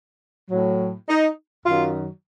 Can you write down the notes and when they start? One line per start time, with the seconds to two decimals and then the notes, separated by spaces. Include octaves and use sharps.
0.50 A2 F#3
1.08 D#4
1.66 F#2 D#3 F#3 F4